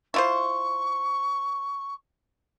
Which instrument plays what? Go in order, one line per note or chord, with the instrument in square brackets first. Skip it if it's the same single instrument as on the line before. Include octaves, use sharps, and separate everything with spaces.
[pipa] E4 F4 C5 [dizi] C#6